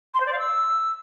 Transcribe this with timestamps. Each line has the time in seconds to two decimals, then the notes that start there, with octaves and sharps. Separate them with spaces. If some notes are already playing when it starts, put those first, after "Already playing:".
0.14 C6
0.20 C5
0.26 D5
0.32 F5
0.38 E6